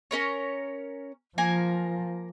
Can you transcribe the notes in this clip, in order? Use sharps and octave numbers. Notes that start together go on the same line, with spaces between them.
C#4 A#4 C#5
F3 A#3 A#4 G#5